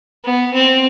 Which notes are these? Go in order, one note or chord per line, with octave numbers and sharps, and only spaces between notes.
B3
C4